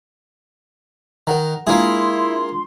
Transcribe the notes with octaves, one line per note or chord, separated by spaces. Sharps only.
D#3 A#4 F#5 A#5
G#3 A#3 D4 E4 F4 G#4 C6